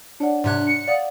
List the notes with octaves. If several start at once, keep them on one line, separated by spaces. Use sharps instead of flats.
D4 C#5 D5 F#5
G#2 C3 C6 D6 F#6 G#6
C#7
D5 F5 F#5 D#6